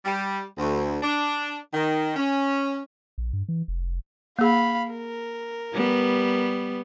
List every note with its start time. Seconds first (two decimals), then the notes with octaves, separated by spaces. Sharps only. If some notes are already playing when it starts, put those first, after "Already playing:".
0.05 G3
0.58 D2
1.03 D4
1.74 D#3
2.16 C#4
3.18 A#1
3.33 G2
3.49 E3
3.68 F1
4.39 A#3 G#4 F5 B5
4.91 A#4
5.73 G3 B3